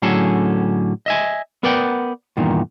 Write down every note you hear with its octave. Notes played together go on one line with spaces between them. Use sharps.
A2 D3 F#3 C#4 G#4 A4
D#5 E5 G#5
B3 A#4 B4 D5 F#5 G5
E2 G2 A#2 D#3